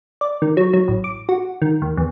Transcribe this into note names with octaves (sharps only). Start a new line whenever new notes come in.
D5
D#3
F#3
F#3
A1
D6
F#4
D#3
D#2
E2